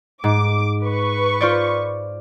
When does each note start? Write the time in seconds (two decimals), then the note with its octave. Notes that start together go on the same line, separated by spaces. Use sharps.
0.24 G#2 D6
0.85 B4 C#6
1.41 F4 C5 D5